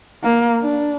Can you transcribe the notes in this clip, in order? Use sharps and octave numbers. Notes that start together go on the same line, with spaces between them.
A#3
D4